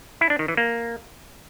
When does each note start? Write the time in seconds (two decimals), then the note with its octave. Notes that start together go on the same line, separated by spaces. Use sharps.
0.21 E4
0.30 D4
0.39 D#3
0.48 E3
0.57 A#3